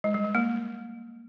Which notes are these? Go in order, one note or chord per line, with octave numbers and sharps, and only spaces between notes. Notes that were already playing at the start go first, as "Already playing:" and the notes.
G#3
G3
G#3
A#3